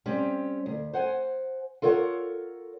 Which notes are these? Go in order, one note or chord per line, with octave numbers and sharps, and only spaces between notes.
G3 C4 C#4 G4
D2
C5 F#5 G#5
F4 A4 A#4 C#5 F#5